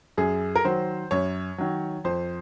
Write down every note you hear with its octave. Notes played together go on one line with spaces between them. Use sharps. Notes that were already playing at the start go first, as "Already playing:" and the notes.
F#2 G#4
A#4
D#3 F#3 C5
F#2 C#5
D#3 F#3
F2 C5